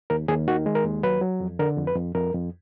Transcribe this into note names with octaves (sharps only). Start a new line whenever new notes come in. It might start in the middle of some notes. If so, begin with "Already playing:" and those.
D#2 A#4
D#2 G#4
D#3 F#4
G#3
A#4
D#2
F#3 B4
F#3
F2
D3 A#4
F2
B4
F2
F2 A#4
F2